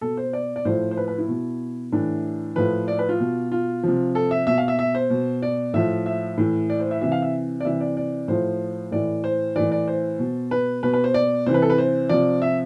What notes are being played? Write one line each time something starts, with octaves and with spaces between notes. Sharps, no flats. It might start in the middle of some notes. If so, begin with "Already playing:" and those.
B2 A4
C5
D5
D5
A2 F3 C5
C5
B4
B4
E4
B2
A2 E3 D4
A2 F3 B4
D5
B4
F4
B2
F4
C3 F3
A4
E5
B2 E5
F5
E5
E5
C5
B2
D5
A2 F3 E5
E5
A2 E3
D5
C5
E5
C3 E3 E5
F5
E5
D5
C3 E3 E5
D5
D5
A2 F3 C5
A2 E3 D5
C5
A2 E3 D5
D5
C5
B2
B4
B2 B4
B4
C5
D5
C3 E3 C5
B4
A4
B4
C5
C3 F3 D5
E5